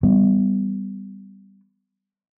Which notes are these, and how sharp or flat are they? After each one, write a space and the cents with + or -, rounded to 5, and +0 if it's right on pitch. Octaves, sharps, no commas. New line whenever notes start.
E3 +0 G3 +0 B3 +20